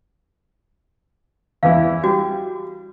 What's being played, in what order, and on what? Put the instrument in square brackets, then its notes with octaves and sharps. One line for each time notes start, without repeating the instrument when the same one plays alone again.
[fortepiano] E2 E3 E4 [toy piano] F5
[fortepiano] G3 [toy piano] F#4